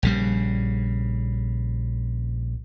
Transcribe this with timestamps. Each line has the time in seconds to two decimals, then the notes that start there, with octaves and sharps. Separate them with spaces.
0.03 A#1 C#3 G3